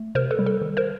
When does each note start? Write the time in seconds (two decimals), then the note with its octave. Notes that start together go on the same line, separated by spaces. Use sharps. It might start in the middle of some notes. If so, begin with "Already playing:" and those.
Already playing: A3
0.15 C3 A#4 C5
0.31 A4 B4
0.39 G3
0.46 A4
0.62 D#3
0.77 A#4 C5